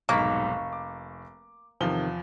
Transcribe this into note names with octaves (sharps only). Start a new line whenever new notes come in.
F1 B1 G#2 A#3 C#6 B6
D6
E2 C3 D#3 F3 G7